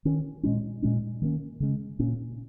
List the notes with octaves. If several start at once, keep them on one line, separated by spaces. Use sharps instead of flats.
D#3 C#4
A#2 G#3 C#4
A#2 G#3 C#4
D#3 A#3 C#4
C#3 G#3 C#4
A#2 A#3 C#4